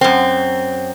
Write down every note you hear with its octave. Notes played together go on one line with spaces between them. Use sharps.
F#2 C4